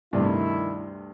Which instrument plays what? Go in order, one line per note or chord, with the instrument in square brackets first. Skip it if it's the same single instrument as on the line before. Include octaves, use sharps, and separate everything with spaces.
[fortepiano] D2 G2 C3 [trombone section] D#3 E4